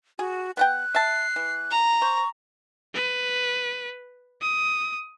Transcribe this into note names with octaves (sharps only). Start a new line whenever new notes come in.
F#4 G#4
B3 F#5 G5 F#6
E5 A5 C7
E3
A#5
C5 C#6
B4
D#6